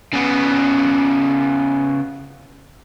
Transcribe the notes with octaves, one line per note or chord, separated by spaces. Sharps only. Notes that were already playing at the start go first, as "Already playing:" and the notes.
C#3 B3